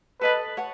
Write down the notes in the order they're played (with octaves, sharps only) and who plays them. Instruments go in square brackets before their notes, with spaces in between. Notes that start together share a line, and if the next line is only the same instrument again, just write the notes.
[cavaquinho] A4 D#5 A5 [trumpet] B4
[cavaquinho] C#5 F#5 A5